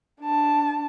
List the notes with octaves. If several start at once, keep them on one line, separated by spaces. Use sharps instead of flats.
D4 A5